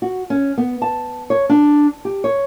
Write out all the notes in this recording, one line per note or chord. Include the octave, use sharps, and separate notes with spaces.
F#4
C#4
B3
A5
C#5
D4
G4
C#5